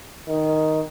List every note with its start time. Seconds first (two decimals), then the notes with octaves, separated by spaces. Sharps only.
0.29 D#3